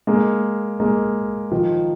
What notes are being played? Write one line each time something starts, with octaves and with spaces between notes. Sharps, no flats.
G#3 A#3
G#3 A#3
D#3 F3